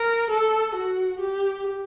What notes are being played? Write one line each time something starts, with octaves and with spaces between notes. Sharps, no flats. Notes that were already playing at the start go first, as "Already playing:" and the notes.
Already playing: A#4
A4
F#4
G4